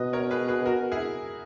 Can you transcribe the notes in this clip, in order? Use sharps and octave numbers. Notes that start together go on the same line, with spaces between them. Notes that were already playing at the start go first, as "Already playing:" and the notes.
Already playing: B2 B4 D#5
A#4 C#5
G#4 B4
G#4 B4
F#4 A#4
E4 G#4